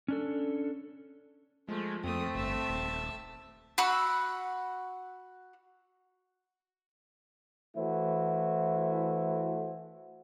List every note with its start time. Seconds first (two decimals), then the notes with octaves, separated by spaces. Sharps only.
0.08 C#4 D4 A4
1.69 F3 G#3 A3
2.04 F2 A3 C4 D#6
2.35 G1 E5 A5
2.69 D#1
3.78 F#4 F#5 B5 E6
7.76 E3 A3 E4 F#4 C5